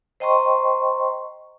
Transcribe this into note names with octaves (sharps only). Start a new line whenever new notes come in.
C5 D#5 G5 A#5 C6 C#6